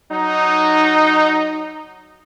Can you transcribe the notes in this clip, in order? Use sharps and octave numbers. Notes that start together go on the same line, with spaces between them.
F#3 D#4